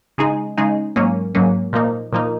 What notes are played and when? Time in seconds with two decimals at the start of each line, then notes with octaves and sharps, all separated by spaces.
0.18 C#3 G#3 D#4 G#4
0.57 C#3 G#3 D#4 G#4
0.96 G#2 F#3 A#3 C#4
1.35 G#2 F#3 A#3 C#4
1.73 A#2 F3 A#3 D#4
2.13 A#2 F3 A#3 D#4